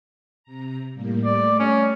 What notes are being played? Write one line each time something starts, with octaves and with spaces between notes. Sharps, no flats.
C3 A#5
A2 G3 A#3
G3 A3 D5
C#4